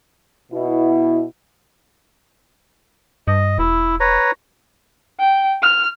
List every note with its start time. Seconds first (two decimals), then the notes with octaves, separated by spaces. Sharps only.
0.53 B2 E4
3.28 G2 D#5
3.59 E1 E4
4.00 B4 C#5 A#5
5.19 G5
5.62 F6